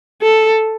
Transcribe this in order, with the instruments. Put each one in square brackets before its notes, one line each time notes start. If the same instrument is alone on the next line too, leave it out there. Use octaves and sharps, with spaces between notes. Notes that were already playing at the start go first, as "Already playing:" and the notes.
[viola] A4